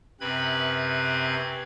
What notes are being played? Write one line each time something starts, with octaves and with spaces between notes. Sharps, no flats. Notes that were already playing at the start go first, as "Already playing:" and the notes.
F#2 C3 C4 B4 B5 G#6